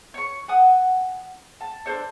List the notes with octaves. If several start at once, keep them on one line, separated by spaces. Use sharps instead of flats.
C#5 C#6
F#5 G#5 D#6
A5
D4 A4 C5 C#5